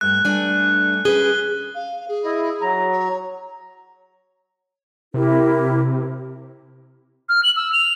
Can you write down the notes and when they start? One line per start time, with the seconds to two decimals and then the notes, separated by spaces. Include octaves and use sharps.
0.01 G2 A3 F#6
0.25 G2 G3 A3 D4 A4 G#5
1.05 C#4 G#4 B4 G7
1.75 F5
2.09 G#4
2.25 E4 D#5
2.62 F#3 A#5
2.92 C#5
5.14 C3 E4 G4 A#4
7.29 F6
7.43 F#7
7.56 E6
7.73 F7